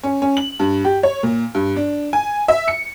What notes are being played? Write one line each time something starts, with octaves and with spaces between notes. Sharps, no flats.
C#4
C#4
F#7
G2
G4
C#5
A#2
G2
D4
G#5
E5
C#7